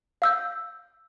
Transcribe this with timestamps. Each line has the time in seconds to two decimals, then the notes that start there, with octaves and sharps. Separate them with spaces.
0.22 F5 E6 G6